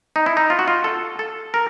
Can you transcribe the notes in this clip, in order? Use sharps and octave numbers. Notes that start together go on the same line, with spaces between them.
D#4
E4
D#4
F4
F#4
F4
A4
A4
A#4